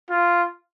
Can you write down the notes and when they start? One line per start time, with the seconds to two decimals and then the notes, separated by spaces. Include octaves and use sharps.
0.11 F4